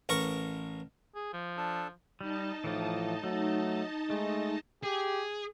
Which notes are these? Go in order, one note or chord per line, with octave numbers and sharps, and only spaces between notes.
A1 A#4 C#6
G#4
F3
D4 A4 A5
G3 D#4 D#5 A5
A2 E3 F3
F#3 A3
G#3 A3
G4 G#4